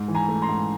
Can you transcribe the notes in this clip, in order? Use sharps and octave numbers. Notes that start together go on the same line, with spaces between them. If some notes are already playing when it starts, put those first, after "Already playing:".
Already playing: G#2
E3
G#5 A#5
A3
A#5 C6
G#2